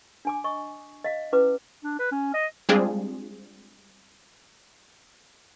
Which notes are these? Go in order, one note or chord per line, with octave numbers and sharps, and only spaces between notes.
D4 G#5 D6
D#5 C#6 D#6
D#5 F5
C#4 E4 B4 D6
D4
B4
C#4
D#5
G3 G#3 C4 D4 F4 G#4